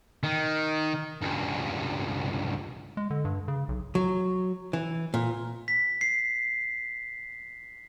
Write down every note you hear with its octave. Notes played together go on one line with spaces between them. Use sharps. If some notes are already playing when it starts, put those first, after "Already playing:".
D#3
C#2 G2
G#3
D3
G2
C#3
B1
F#3
E3
A#2
B6
C7